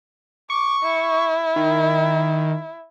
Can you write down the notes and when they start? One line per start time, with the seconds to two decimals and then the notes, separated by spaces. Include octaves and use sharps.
0.50 C#6 D6
0.83 E4
1.56 D#3